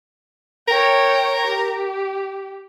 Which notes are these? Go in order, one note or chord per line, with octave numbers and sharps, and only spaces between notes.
A#4 C#5 G5
G4